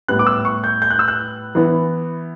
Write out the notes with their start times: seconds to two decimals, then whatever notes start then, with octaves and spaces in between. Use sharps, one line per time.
0.08 A2 G3 B3 F#6
0.19 D6
0.27 E6
0.45 C#6
0.64 G6
0.82 G6
0.90 F#6
0.99 E6
1.08 F#6
1.55 E3 B3